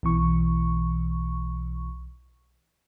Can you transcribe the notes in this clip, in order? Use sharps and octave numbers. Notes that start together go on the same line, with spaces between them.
B1 B2 E3 C#6